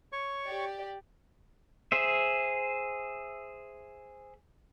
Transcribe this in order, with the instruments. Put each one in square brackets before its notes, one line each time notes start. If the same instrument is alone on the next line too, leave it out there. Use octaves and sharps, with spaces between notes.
[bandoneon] C#5 C#6
[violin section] G4 D5
[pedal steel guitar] G#4 C5 E5